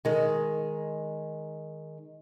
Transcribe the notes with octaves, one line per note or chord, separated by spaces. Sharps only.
D#3 G#3